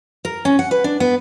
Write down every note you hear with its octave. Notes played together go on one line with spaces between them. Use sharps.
A#4
C#4
F#5
B4
D4
B3